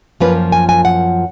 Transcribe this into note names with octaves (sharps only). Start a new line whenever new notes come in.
F#2 F3 A#3 C#4 F4 B4
G#5
G#5
F#5